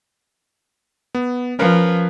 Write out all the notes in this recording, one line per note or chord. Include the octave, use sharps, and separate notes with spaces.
B3
F3 C#4 A#4 B4